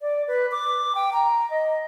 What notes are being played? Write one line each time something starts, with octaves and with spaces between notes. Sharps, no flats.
D5
B4
D6
G5
A#5
D#5